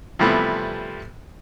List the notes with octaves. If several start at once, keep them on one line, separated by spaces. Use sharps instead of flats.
C3 E3 F3 G3 A3 B3